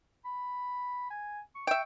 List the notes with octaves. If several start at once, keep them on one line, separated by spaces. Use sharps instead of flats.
B5
G#5
C#6
E5 G5 C#6